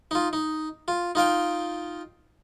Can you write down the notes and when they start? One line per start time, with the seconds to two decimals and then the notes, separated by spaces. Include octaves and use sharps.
0.11 D#4 F4
0.33 D#4
0.88 F4
1.15 D#4 F4 F5 G5